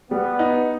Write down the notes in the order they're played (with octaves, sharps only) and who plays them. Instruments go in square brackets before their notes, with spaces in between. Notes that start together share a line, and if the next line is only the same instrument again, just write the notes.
[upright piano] G3 [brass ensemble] B3
[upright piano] D#4